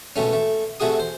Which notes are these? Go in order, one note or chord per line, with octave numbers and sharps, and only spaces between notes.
C#2 B2 A3 C#4
A3
C3 A3 F#4 G#4 D#6
C5